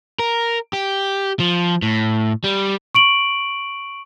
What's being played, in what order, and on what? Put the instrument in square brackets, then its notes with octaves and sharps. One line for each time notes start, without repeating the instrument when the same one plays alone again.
[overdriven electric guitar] A#4
G4
F3
A2
G3
[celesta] C#6 D7 F#7